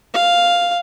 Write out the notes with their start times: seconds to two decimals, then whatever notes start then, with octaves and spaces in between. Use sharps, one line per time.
0.14 F5